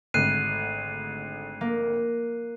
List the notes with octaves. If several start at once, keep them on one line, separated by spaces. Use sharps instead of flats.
G#1 D3 A3 F#6 C7 D#7
A#3